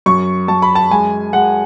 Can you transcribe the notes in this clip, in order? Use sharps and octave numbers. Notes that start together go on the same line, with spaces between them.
F#2 C#6
F#2 A5
B5
A5
G#3 G#5
G#3 F#5